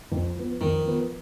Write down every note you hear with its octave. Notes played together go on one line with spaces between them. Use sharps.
F2
F3 B3
F2 D#3
F3 B3